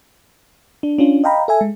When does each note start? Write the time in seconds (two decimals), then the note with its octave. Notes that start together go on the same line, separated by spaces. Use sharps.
0.83 D4
0.98 C#4 D4 F4
1.24 D#5 F5 G5 A#5 B5
1.48 A4 E5 G#5
1.61 G#3